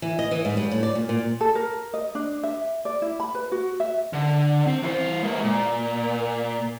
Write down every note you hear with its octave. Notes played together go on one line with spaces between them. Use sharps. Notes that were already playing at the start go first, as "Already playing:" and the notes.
E3
D#5
E3
G#2
G2
A2
D5
A#2
A#2
A4
A#4
D#5
D4
E5
D5
E4
B5
B4
F#4
E5
D3
C4
E3 C5
G#3 A#3
A#2